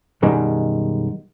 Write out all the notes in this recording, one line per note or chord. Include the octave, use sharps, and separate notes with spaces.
F#2 B2 D#3 G3 G#3